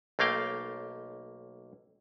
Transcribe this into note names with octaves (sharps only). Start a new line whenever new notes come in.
B1 A3 A#3 F5 G5